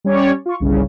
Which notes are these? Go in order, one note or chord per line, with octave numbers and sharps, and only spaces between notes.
G3 C#4 C#5 D5
F4 C#6
G1 C2 C#3